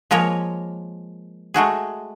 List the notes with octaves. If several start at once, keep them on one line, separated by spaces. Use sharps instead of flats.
F3 G#3 A#3 A#4 C#5
G#3 A3 F#4 G#4